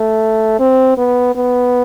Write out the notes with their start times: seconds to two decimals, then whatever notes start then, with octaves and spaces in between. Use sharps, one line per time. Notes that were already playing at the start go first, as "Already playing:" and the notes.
Already playing: A3
0.59 C4
0.98 B3
1.35 B3